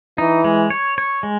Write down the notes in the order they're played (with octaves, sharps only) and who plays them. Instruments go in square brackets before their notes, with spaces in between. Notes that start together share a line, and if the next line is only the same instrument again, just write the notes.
[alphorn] E3 [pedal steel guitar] D#4
[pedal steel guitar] G#3
C#5
C#5
G#3